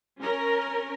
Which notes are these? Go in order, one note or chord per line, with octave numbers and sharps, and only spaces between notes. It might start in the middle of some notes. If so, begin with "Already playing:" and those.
C#4 A#4